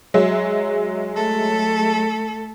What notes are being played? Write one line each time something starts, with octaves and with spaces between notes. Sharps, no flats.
F#3 G#3 E5
A3 A4